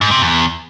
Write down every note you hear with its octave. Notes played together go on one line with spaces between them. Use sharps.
G#2
C3
E2